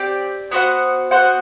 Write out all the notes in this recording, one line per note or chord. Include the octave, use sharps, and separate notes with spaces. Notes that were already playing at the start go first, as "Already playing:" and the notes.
Already playing: C4 G4 D5 G5
B3 F#4 C5 F#5
B3 F#4 C5 F#5